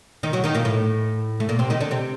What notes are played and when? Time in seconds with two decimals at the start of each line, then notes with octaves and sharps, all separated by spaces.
0.23 D#3 D#4
0.33 F#3 F#4
0.44 D#3 D#4
0.55 A#2 A#3
0.65 A2 A3
1.40 A3
1.49 A#2 A#3
1.59 C3 C4
1.70 D#3 D#4
1.81 D3 D4
1.91 C3 C4